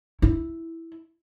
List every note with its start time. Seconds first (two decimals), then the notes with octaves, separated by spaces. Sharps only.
0.22 E4